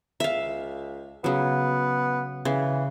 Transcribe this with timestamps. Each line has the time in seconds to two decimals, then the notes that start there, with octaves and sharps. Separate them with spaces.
0.20 C#2 E5 F5
1.24 C#3 F#3 B3
2.45 C#3 E3